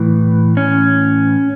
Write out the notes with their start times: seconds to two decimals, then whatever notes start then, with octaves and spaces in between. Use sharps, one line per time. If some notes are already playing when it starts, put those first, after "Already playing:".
Already playing: A2 E3
0.57 C#4